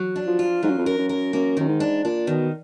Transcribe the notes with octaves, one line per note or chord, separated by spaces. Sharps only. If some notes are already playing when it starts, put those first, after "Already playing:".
Already playing: F#3
D4
F3
F4
G#2 F#3
F#2
F2
F#2 A#4
F#2
A#4
F#2 A#3
F#2 D#3
G#2
D4
A#2 D4
B2 D#3